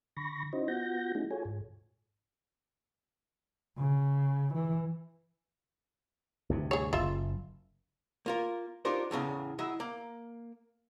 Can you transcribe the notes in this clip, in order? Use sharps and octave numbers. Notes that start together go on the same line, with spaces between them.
D3 B5 C#6 A#6
C#4 D#4 E4 F#4 C5 D#5
B3 F4 F#4 F#5 G6 A#6
A3 C#4 D#4 E4 F#4 G#4
F4 F#4 G#4 A4 C#5 G#5
G#2
C#3
E3
D2 G2 C3
G#4 C#5
F#1 F4 E5
A#3 F4 A#4
D4 D#4 F4 G4 A#4 C5
E2 A2 C#3 F5
F#3 E4 D#5 E5
A#3